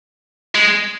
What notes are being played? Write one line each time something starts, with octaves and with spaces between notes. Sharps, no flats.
G#3